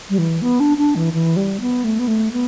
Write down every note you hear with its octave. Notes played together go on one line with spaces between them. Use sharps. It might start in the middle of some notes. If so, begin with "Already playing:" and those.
G3
E3
B3
D4
D4
E3
E3
G3
B3
A3
B3
A3
B3